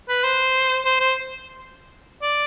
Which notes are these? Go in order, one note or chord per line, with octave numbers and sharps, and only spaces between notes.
B4
C5
C5
C5
D5